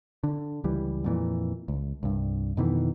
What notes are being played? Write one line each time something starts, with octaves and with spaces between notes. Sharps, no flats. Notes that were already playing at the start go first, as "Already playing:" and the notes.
D3
C#2 E3 G3
F2 A#2 E3
C#2
C2 G2
F2 B2 D#3 E3